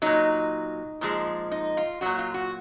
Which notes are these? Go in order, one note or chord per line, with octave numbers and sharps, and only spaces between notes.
A#2 F#3 D#4
A#2 F3 G#3
D#4
F4
A#2 F#3 F#4
F4
F#4